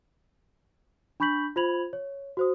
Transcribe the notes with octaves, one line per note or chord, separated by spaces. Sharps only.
D4 B5 C#6 G6 B6 F#7
F4 C5 B5 G#6 F7 F#7
C#5
F#4 C5 D#6